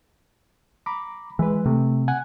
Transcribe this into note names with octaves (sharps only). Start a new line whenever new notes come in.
A#5 B5 D6
E3 G#3 B4
C3 A3
F#5 G#5 F#6